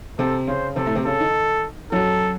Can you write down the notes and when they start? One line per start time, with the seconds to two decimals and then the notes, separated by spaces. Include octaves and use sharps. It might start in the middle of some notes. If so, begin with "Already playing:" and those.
0.19 C3 C4 A4
0.47 C#3 C#4 C5
0.76 C3 C4 A4
0.86 A2 A3
0.95 C3 C4
1.05 C#3 C#4 A4
1.20 D#3 D#4
1.92 F#2 F#3 A4